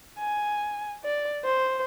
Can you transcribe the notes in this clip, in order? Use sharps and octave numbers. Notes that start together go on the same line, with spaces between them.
G#5
D5
C5